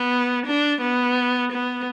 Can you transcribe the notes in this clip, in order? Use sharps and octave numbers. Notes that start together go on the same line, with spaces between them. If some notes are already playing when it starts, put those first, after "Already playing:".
Already playing: B3
D4
B3
B3